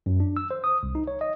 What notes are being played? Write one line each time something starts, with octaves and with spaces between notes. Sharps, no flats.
F#2
D4
E6
C5
D#6
C2
D#4
C#5
D#5